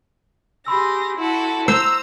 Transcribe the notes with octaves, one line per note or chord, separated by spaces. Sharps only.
G4 G#4 B5 C6 E6 A#6
E4 F#4 A4
C5 A#5 E6